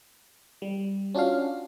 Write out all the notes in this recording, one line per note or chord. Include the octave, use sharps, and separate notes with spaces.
G3
C#4 D4 F4 F#4 F5